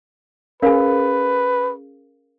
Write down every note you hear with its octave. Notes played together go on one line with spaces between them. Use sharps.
C#4 G#4 A#4 B4 F5 B5